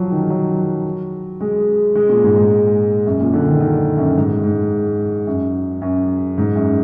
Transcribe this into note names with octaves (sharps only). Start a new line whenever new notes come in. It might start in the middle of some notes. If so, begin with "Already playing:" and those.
Already playing: F3 F#3
D#3
F#3
G#3
G#3
A#2
G#2
G#2
F#2
A#2
D3
D#3
D#3
F#2
G#2
G#2
F#2
F#2
G#2
F#2